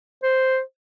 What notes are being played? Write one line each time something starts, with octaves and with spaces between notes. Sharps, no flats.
C5